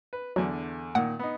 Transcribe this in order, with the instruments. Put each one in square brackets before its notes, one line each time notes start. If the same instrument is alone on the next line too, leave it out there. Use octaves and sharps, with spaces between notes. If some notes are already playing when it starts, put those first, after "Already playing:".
[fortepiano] B4
[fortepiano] E2 D3 [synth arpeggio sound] F#3
[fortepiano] A#2 D#3 [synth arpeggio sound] F#5
[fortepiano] B3 D#4